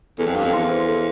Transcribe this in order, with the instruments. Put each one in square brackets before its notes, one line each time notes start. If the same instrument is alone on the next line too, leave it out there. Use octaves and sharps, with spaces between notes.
[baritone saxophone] E2 [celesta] A4
[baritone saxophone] F2
[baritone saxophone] G2 [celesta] F5
[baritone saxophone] F2
[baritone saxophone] E2 [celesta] C6
[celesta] C5
A4